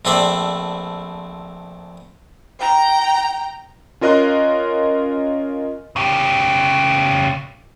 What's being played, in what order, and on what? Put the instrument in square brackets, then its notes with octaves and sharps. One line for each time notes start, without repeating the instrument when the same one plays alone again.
[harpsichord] A#1 A3 C4 D5 E5
[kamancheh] G5 A#5
[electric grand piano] C#4 F4 A#4 D#5 C6 F#6
[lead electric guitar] C#3 G4